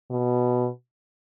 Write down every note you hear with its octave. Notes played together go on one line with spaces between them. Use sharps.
B2